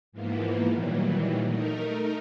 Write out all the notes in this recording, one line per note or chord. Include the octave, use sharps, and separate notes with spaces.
G#2 E3 F3 A#3 B3
A#2 D#3 E3 F#3 G3
A3 D#4 A#4